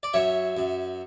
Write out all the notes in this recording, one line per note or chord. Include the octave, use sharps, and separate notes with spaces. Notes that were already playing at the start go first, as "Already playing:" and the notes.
D5
F#2 C#5 E5
F#2